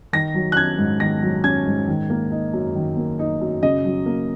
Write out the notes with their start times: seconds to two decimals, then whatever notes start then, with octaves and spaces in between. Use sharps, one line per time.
0.13 D#3 A#6
0.34 F#3
0.52 F#6
0.56 C#4 G#6
0.78 G#2
1.00 D#3 A#6
1.22 F#3
1.44 C#4 G#6
1.66 G#2
1.88 D#3
2.10 A#3
2.31 D#4
2.53 F#2
2.75 D#3
2.97 A#3
3.19 D#4
3.41 F#2
3.63 C#3 D#5
3.84 F#3
4.06 A#3